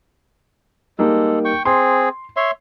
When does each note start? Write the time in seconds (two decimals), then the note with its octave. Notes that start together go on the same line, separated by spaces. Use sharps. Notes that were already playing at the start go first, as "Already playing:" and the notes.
0.99 G3 G#3 A#3 D#4 A4
1.45 G5 C#6
1.65 C4 G#4 C6
2.36 C#5 E5 C6